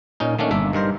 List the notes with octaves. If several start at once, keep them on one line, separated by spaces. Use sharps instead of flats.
A#2 C#4 D#4
D#3 A3 A#3 C#4 D4
G1 A#3 D4 E5
G2 D#3 A#4 C5